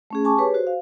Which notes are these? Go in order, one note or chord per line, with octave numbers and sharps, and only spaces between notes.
A3 C#4 G#4
G#5 A5 C#6 D6
G4 G#4 B4 C#5
F#4 C5
F5